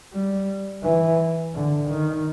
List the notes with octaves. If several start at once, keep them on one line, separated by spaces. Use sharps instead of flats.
G3
E3
D3
D#3